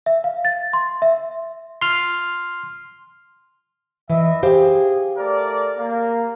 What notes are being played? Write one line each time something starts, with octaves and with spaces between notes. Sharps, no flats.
E5
F5
A6
C6
E5
C6 F6
E3 B4 D#5 E5
G4 G#4 C5 F5
A3 A#4 D5
A#3